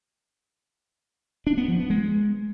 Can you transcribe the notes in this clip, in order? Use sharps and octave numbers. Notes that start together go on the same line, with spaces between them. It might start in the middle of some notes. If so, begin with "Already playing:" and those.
D4
B3
F3
B3
G#3